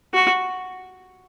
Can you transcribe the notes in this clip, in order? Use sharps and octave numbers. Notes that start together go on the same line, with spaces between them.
F#4